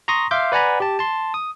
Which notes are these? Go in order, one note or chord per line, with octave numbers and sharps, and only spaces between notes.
A#5 C6 C#6 D#6 A#6
E5 F5 C6 D6 G6
B4 D5 F#5 G#5 A#5 B5
G4 A5
A5 C6
D#6